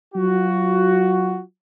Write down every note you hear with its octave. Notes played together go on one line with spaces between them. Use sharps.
F#3 F4 F#4